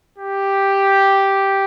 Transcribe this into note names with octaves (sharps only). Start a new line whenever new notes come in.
G4